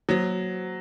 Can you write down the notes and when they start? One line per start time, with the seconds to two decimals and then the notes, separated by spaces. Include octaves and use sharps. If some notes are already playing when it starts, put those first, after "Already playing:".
0.09 F#3 A#3 F#4 C5